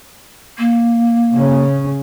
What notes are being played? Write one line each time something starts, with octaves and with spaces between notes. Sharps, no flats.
A#3
C#3 C#4